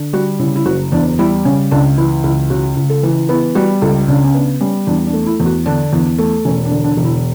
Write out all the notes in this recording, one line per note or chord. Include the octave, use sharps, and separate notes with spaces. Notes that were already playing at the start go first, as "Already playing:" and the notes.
Already playing: D3
G3 F#4
C#3 E4
E4
F#1 F#4
E2 D4
G3 E4
C#3 C#4
C#2 D4
E3 E4
C#2 E4
C#3 F#4
C#2
A4
E3
B3 E4
G3 F#4
C#2 A4
C#3 D4
C#4
B3 D4
G3 C#4
E2 D4
D4
A3
E4
E2
F#4
D3 D4
E2
A3
E1 C#4
D4
D3
D4
E1
E4